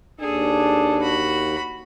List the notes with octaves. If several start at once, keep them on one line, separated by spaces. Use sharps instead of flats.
D#2 D4 G#4 A4
F#4 B5